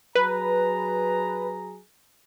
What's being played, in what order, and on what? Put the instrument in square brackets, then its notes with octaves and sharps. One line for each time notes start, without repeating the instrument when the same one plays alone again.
[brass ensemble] F#3 G#4 A#5 [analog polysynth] B4